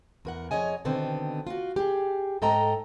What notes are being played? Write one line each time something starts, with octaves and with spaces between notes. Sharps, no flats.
E2 A#4 F#5
F2 G#4 C#5 D#5 G#5
B2 D3 D#3 B3 C4
F4 F#4
G4 G#4
G#2 A4 D#5 G5 A#5